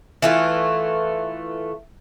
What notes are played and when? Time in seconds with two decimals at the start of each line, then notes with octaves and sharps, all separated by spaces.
0.22 E3 A3 F4